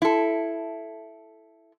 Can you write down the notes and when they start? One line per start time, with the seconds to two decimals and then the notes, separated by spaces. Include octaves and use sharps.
0.02 E4 A4